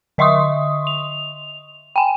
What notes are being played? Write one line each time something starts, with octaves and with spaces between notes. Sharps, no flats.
D3 D#5 E5 C6 C#6 D#6
F7
G5 G#5